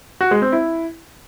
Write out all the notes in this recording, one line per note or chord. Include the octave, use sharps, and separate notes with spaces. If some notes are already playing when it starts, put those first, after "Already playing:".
F#4
G#3
C4
E4